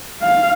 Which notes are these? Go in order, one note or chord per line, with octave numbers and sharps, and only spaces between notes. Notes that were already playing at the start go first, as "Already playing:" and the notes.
F5